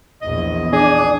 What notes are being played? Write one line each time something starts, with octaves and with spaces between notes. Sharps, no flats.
A#1 E2 D#5
D4 G#4